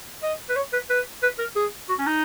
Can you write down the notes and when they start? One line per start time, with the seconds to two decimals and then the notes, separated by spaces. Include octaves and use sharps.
0.23 D#5
0.49 B4
0.56 C#5
0.73 B4
0.90 B4
1.23 B4
1.39 A#4
1.56 G#4
1.89 F#4
1.99 C#4
2.07 D#4